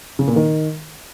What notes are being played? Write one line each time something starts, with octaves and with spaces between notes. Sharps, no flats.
C#3
A#2
D#3